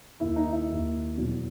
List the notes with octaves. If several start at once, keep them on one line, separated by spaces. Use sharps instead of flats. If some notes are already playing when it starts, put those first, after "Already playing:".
D#2 D#3 A#3 E4 E5
D#4 D#5
E4 E5
D#2 D#3 A#3
E2 B2 F#3 B3